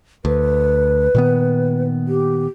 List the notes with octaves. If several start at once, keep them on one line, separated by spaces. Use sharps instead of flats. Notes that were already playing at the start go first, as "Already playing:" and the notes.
D2 B4
A#2 D#3 B3
G4